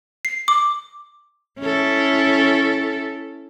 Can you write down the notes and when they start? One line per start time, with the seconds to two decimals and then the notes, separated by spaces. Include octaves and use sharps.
0.25 C7
0.48 D6
1.59 C#4 E4 A4